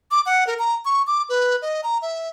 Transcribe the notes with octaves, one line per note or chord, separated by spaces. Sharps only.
D6
F#5
A#4
A#5
C#6
D6
B4
D#5
A#5
E5